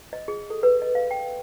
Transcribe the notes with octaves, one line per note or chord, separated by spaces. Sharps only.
D#5
G#4
A4
B4
D#5
F5
G5